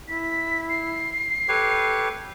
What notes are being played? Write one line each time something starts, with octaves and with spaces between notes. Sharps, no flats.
E4 B6
C7
G4 A4 B4 C#5